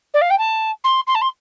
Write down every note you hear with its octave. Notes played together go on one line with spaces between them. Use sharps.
D5
F5
G5
A5
C6
C6
A5
C6